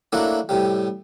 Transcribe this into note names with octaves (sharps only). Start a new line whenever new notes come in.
F#3 A3 A#3 D4 E4 F#4
A2 C3 G3